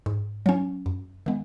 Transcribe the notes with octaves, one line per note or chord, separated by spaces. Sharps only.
G#2
F#3 C#4
F#2
D#3 G#3 B3